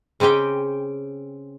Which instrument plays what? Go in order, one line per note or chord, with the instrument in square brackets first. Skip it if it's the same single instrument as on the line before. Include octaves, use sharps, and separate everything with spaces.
[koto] C#3 C4 C#4 G4 G5